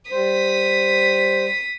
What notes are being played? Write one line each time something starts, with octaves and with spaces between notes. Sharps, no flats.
G3 C5 D#6 B6